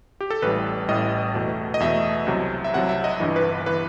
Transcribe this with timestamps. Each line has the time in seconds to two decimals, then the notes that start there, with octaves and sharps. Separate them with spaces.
0.21 G4
0.30 A4
0.42 A1 A2 G3 B4
0.88 A1 A2 G3 D#5
1.34 E2 B2 A3
1.74 D#5
1.80 E2 B2 A3 E5
2.27 C2 C3 F#3
2.64 E5
2.73 C2 C3 F#3 F#5
2.89 E5
3.04 D#5
3.20 G1 G2 E3
3.36 B4
3.66 E3 B4